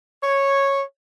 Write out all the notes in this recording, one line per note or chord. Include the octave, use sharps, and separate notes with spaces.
C#5